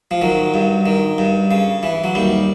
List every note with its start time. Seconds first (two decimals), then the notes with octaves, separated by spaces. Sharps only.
0.11 F3
0.22 D#3 F#3
0.54 G2
0.86 D#3
1.18 G2
1.51 C#3
1.83 E3
2.04 F#3
2.15 D#2 G3